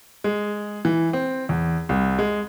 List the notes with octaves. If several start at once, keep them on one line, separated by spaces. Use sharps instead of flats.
G#3
E3
C4
E2
C2
G#3